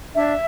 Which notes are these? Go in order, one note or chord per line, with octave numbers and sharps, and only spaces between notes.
D4 E5